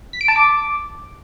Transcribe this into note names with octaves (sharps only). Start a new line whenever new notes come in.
B6
D7
A5
D6